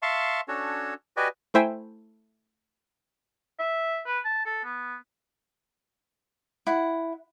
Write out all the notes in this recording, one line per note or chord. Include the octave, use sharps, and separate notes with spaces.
E5 F5 A5 C6 C#6
C#4 D4 F#4 A4 C#5
F#4 G4 B4 D5 D#5 G#5
A3 E4 C5 E5 G5 G#5
E5
B4
A5
A4
B3
E4 F#5